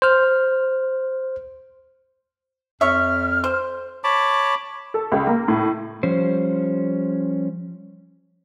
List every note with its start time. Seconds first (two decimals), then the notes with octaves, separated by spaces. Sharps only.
0.02 C5 F6
2.81 F2 C#5 E5 F6
3.44 C5
4.04 C#5 A5 B5 D6
4.94 A4
5.12 C#2
5.27 A#3
5.48 A2
6.03 F3 G3 C#4 C5